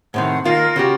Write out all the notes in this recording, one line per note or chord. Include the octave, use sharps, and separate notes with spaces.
A2 C3 D#3 C5 F#5
D#3 A#3 F4 A#4 F5
C#3 F#4 G4